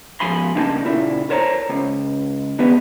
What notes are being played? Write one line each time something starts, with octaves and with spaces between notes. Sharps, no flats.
G#2 F3 G#5 B5 C6
G2 C#3 F#3 A#3 D#4 A5
A#2 C#3 E4
A#4 C5 C#5 A5 A#5
C#2
D#3 B3 G4 B4